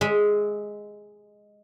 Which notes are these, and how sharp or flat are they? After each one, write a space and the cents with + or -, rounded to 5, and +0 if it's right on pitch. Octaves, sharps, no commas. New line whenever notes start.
G#3 +0 E5 -15